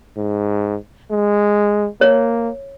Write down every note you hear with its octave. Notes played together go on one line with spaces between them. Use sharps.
G#2
G#3
A#3 C#5